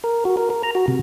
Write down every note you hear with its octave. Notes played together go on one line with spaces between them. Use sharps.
A#4
F#4
A#4
A#4
A#5
F#4
C3